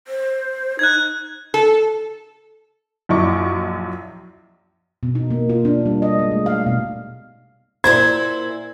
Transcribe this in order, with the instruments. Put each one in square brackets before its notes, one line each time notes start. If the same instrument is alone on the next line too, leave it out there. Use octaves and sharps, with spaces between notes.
[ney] C5
[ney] D#4 [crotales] F#6 G#6
[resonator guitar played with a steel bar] A4
[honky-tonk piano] A#1 F#2 E4 D#5 C#6 D6
[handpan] B2
D#4
A#3
F4
D4
G3
D#5
G#3
A3
F5
B2
[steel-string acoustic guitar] A#2 E4 C5 [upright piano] G#6